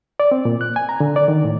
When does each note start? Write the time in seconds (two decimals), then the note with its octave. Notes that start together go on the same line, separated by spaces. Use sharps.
0.20 D5
0.31 C4
0.45 A#2
0.61 F#6
0.76 G#5
0.89 A#5
1.00 D3
1.16 D5
1.28 D#3
1.45 A2